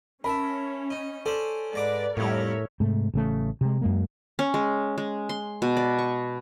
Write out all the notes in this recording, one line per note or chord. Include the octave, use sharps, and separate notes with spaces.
C#4 A#4 E5 A5 B5
D#4
C#4 A4 C5 D5
G#2 B4 D5 A#5 D6
F2 A2 G3 A#4 C#5 E5
G#2 C3 A3
A1 C#3 A3
C3 G#3
F#2 G#3 A#3
C#4
G#3
G#3
C6
B2
D5
C#6